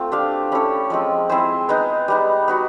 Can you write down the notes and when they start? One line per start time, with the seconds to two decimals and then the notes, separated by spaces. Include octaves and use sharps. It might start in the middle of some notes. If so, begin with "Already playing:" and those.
Already playing: A3 C4 F4
0.12 D4 G4 C5 F5
0.52 C#4 E4 A4 C#5
0.90 F3 G#3 C4
1.29 C4 E4 G#4 C5
1.69 G#3 B3 D#4
2.08 G3 B3 D#4
2.48 B3 D#4 F#4